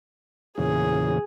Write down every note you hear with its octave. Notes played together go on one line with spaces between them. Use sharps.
E2 A#2 C#3 G#4